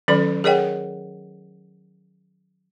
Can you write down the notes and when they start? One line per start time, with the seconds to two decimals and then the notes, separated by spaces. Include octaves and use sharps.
0.08 D#3 F#3 C#4 A4 D5 B5
0.44 G#4 A#4 C#5 D#5 F#5 G5